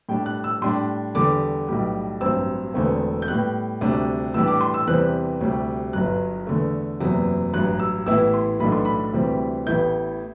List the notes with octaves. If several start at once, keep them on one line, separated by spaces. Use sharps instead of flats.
A2 G3 D4 G5
F#6
E6
A2 G3 D4 C6
E2 D3 G3 D6
B1 A2 G3
A1 G2 F#3 C4 E6
E1 E2 D3 A3 C4
G6
A2 G3 B3 F#6
D2 C3 G3 D4
A2 E3 G3 D4 E6
D6
C6
E6
E2 C3 E3 G3 C4 F#6
D2 C3 G3
G1 G2 F#3 F#6
E2 D3 A3
F#1 E2 C3 F#3 B3
A1 G2 F#3 F#6
E6
A1 A2 E3 B3 E4 E6
C6
B1 A2 E3 A3 D4 B5
C6
B5
D2 C3 E3 G3 C4
A1 A2 E3 B3 E4 G6